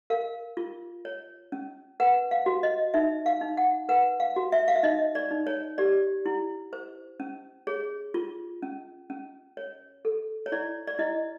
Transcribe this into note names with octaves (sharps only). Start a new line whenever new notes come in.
A#4 F5
F4
C#5
C#4
B4 F#5
F5
F#4
D#5
D#4 E5
F5
D#4
F#5
B4 F#5
F5
F#4
E5
F5
E5
D#4 D#5
D5
D#4
C#5
G4 D5
E4
C5
C#4
G#4 C#5
F4
C#4
C#4
C#5
A4
C#5
E4 D5
D5
E4 D#5